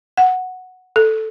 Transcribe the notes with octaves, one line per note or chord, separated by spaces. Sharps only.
F#5
A4